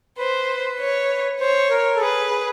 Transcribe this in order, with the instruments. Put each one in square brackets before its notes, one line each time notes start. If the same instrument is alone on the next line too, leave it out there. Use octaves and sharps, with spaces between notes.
[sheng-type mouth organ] B4 [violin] C5
[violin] C#5
[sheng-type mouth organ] C5 [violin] C#5
[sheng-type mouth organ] A#4
A4
[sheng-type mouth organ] G#4 [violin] B4
[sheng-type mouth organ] G#4